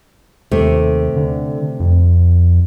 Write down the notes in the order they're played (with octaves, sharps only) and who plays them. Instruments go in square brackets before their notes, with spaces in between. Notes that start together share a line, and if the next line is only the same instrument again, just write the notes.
[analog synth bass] D#2 [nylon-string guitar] C3 A3
[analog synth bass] D3
F2